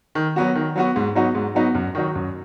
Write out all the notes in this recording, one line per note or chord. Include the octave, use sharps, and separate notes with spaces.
D#3
F#3 B3 F#4
D#3
F#3 B3 F#4
G#2
F#3 B3 D#4 F#4
G#2
F#3 B3 D#4 F#4
F#2
D#3 F#3 D#4 F#4
F#2